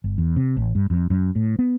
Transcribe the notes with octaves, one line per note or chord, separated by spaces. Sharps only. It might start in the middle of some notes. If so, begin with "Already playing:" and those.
G1
E2
C3
A1
G2
F2
F#2
A2
B3